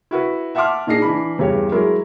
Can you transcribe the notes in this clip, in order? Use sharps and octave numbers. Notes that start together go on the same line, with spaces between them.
E4 F#4 B4
E5 F#5 A5 C6 D6 F6
A#2 D4 D#4 G#4 A#6 C7
E3 D4 B5
E2 G2 C#3 G4 C#5
F#3 G#3 E4 A#4